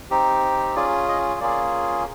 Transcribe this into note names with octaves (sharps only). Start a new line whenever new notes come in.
C4 D#4 G4
C#4 F4 G#4 D5
D#5
A#3 C#4 F4 G#4 D5